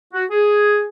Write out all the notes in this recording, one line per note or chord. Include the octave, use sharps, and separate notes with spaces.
F#4
G#4